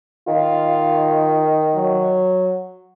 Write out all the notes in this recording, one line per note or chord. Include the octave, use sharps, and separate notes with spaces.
D#3 F4
F#3